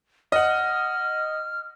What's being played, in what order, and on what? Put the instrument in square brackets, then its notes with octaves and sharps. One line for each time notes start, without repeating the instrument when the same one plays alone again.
[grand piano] D#5 F#5 [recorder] F6